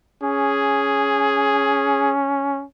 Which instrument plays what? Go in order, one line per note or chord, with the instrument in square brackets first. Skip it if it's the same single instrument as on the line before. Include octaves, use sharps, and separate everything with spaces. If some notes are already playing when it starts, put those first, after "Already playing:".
[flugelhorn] C#4 [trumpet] G#4